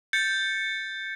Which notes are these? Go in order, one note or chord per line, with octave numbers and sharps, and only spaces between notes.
G6 A6 C#7